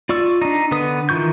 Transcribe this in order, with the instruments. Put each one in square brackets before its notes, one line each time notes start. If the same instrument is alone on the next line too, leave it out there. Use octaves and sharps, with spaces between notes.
[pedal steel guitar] F4 D5 C#6 E6
D4 D#4
D3 B3 B4 D#6
D#3 E3 F4 C#6 G6